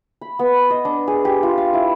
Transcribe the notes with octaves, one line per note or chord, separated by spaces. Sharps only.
B5
B3
D#5
D4
G#4
G4
F4
F5
E4